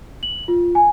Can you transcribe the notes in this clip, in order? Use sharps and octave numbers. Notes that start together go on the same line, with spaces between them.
F#7
F4
G#5